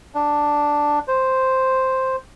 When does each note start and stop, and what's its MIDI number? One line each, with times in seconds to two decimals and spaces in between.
0.15 0.99 62
1.08 2.16 72